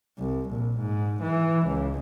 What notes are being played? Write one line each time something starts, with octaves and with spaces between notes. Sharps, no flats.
C2
A#1
G#2
E3
C#2